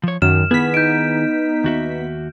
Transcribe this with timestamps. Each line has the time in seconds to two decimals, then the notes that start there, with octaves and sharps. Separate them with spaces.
0.04 F3 C#5
0.22 F#2 D#3 F6 E7
0.51 D#3 B3 E4 G#4 B6
0.74 D#4 G6 D7
1.64 D#2 F#4 E5